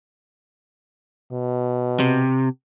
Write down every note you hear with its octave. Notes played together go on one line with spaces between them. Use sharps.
B2
C3